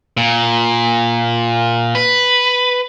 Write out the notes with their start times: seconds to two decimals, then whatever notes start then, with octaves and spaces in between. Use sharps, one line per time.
0.17 A#2
1.95 B4